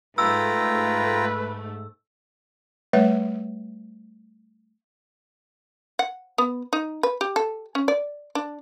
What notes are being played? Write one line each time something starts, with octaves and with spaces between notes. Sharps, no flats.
G#2 A3 F4 B4 G5 A#5 E6
G3 A3 B4 C#5 E5
F#5
B3
D#4
B4
G4
A4
C#4
D5
D4